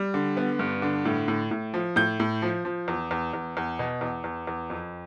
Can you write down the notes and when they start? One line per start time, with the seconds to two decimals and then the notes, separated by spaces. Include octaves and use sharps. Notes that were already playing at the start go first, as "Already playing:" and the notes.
Already playing: G3
0.14 D3
0.37 B3
0.59 G2
0.82 D3
1.05 A2
1.28 A2
1.51 A2
1.74 F3
1.96 A2 G6
2.20 A2
2.42 F3
2.65 F3
2.88 E2
3.11 E2
3.34 E2
3.57 E2
3.79 B2
4.01 E2
4.24 E2
4.47 E2
4.70 F2